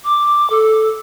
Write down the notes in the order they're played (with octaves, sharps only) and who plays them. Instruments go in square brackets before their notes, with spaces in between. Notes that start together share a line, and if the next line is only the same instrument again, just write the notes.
[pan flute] D6
A4